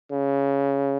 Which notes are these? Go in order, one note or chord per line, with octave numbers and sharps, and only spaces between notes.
C#3